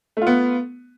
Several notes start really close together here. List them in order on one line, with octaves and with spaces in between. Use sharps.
A3 F4 B3